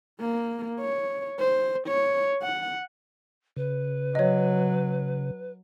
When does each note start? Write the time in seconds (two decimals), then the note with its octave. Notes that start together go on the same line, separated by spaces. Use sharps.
0.20 A#3
0.80 C#5
1.39 C5
1.88 C#5
2.43 F#5
3.57 C#3 B4
4.15 F#3 C#5 D#5